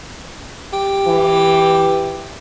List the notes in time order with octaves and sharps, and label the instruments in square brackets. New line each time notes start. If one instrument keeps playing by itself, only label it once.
[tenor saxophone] G4
[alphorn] E3